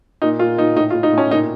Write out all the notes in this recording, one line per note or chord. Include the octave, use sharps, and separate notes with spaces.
A#2 D#4
A#2 F4
A#2 D#4
A2 D#4
F4
A2
D#4
A2 C#4
A#2 D#4